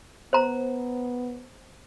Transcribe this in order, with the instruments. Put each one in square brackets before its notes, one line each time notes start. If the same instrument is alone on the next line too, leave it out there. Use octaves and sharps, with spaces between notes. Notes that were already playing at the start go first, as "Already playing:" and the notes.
[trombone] B3 [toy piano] C5 A#5